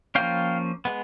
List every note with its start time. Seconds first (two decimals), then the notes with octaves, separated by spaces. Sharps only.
0.15 F3 A#3 C#4 F5 G5
0.85 G#3 B3